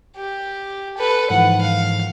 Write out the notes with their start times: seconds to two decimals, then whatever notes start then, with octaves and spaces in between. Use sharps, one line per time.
0.16 G4
0.97 A4 B4
1.30 G#2 E3 F3 F#5
1.61 F5